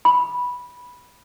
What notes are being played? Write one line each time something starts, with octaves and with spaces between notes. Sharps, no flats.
B5